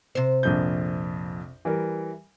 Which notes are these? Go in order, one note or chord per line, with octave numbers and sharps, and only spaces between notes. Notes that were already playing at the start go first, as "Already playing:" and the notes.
C3 C5
A#1 F2 G6
E3 G3 A#4